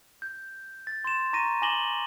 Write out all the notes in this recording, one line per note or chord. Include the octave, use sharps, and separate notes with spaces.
G6
A6
C6 E7
A#5 C#6 A#6 D#7
G#5 D6 A#6 E7 F#7 G7